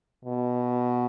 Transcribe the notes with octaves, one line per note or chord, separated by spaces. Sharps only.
B2